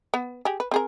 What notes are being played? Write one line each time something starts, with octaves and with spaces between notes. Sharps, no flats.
B3
G4 G#4
B4
C4 G#4 A#4